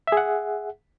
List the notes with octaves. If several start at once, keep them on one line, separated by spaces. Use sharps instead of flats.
G#4 E5 F#5